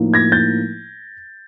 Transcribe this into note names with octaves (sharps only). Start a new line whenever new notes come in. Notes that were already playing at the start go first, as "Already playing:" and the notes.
Already playing: A2 F3 A#3 D#4
G#6 A#6
G6 A6